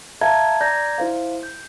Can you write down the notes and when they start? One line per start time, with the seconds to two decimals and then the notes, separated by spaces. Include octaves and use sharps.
0.21 E5 F5 A5 A#5 G#6
0.61 D5 A#5 G6 G#6 A#6
0.98 E4 C5 F5
1.43 G6